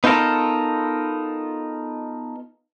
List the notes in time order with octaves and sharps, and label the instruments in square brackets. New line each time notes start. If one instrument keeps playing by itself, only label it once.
[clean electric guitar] B3 D#4 F4 A4 A#4